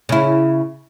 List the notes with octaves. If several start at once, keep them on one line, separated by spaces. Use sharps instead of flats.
C#3 E4